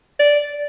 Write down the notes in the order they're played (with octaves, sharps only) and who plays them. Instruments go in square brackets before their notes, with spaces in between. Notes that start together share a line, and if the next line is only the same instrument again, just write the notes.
[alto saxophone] D5